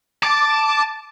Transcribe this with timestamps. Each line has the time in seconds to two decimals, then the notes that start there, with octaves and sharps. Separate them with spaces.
0.23 A5 D6